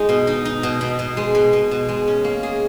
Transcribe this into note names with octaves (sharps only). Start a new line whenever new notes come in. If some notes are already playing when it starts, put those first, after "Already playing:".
Already playing: G#3 D#4
B2
D#4
D#4
B2
B2
B2
G#3
B2
B2
B2
G#3
C#4
A#3
G#4